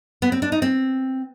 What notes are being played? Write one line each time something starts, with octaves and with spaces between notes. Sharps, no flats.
B3
C4
D4
D#4
C4